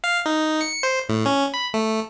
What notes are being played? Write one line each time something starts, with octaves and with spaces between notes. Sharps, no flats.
F5
D#4
C#7
C5
A2
C#4
B5
A3